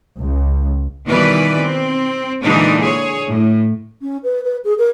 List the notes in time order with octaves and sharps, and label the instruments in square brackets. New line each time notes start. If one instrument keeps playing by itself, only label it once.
[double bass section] C#2
[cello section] B2 D#3 E3 G3 B4 D5
C4
A#2 D3 E3 G#3 D4 D#4
G#4 C#5
A2
[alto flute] C#4
B4
B4
G#4
A#4